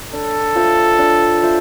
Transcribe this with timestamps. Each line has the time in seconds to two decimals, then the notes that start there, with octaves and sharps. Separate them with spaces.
0.12 D4 A4
0.56 F4 C5 E5
0.99 D4
1.42 F4 C5 E5